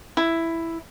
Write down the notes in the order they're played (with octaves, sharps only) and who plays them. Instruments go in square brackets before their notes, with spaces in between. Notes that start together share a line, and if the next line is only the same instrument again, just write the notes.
[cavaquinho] E4